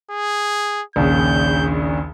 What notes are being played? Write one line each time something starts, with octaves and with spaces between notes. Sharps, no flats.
G#4
A#1 D#2 C#3 G6